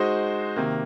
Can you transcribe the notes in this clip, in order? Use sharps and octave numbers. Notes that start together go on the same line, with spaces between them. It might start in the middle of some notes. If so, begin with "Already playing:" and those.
Already playing: G#3 D#4 F#4 C5
C3 D#3 A#3